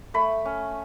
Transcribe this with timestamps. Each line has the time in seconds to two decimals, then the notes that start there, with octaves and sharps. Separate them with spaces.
0.14 A3 B5
0.45 C#4